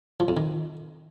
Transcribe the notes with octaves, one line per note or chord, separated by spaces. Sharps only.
F3
F2
D#3